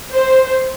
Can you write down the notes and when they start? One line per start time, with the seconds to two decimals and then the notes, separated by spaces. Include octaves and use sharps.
0.14 C5